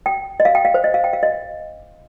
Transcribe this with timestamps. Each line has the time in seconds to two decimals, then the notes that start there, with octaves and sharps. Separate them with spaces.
0.06 G5
0.40 D#5
0.45 F5
0.55 G5
0.65 F5
0.74 C5
0.84 D#5
0.94 F5
1.04 G5
1.13 F5
1.23 D#5